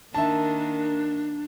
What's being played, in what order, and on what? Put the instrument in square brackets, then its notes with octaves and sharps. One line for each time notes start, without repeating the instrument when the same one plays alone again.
[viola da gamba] D#3 A#3 [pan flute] D4 [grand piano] E5 A5